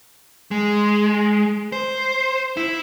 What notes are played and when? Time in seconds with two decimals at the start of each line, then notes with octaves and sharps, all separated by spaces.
0.51 G#3
1.72 C5
2.57 E4